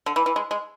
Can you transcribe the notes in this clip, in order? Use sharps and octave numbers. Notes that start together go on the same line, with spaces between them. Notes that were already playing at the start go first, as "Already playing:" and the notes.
D3
E3
E3
G#3
G#3